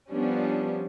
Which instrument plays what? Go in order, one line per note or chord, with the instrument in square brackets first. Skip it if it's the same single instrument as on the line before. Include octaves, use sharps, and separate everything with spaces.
[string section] F3 G3 B3 C#4 D4